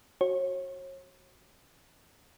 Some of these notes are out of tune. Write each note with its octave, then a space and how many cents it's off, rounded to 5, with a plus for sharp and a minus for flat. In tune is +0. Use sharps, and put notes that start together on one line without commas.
F#4 +0 C#5 -40